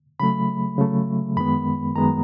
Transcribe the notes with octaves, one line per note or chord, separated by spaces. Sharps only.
C#3 F#3 A3 B5
C#3 F#3 A3
F#2 D#3 G#3 B3 B5
F#2 D#3 G#3 B3 A#5